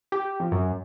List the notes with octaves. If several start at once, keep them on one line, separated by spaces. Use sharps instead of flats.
G4
F2
F#2